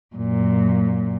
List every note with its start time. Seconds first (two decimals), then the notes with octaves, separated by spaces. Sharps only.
0.16 F#2 A#2